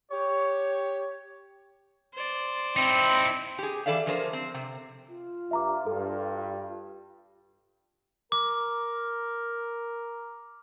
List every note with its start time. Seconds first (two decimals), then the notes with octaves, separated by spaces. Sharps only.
0.11 G4 C#5
2.14 C5 D5
2.76 C4 D#4 E4
3.59 G4 G#4
3.86 E3 A4 D5 E5 F5
4.06 D3 F3 G#4 A#4 C5
4.33 C4
4.54 C3
5.09 F4
5.51 G2 E5 A#5 D6
5.86 G2 A4
8.32 A#4 D6